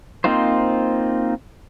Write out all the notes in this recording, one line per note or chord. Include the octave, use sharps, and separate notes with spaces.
A#3 C4 D#4 F4 C5